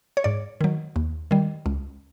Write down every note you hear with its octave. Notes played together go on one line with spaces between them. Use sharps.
C#5
G#2 D5
D#3 F#3
D#2
D#3 G3
C#2